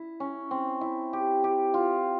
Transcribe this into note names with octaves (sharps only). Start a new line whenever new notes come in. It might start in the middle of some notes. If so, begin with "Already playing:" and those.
Already playing: E4
C#4
C4
E4
G4
G4
F4